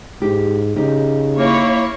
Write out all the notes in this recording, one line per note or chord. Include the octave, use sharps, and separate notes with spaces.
G#2 G4
C#3 D#4 G4
A#3 E4 C#5